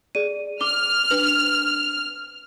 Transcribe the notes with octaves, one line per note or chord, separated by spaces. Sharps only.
G#4 D5 D#7
D6 F6 G7
D4 B4 F#7